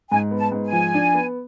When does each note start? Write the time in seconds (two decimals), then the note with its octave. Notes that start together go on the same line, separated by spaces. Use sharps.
0.10 G#2 G#5
0.31 B3
0.39 A5
0.52 G#2
0.66 G#5
0.72 F3
0.94 D4
1.14 B3